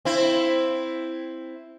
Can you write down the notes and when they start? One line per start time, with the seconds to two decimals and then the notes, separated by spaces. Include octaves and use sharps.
0.05 C4 E4